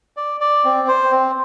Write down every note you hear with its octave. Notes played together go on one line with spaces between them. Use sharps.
D5
D5
C4
C5
C4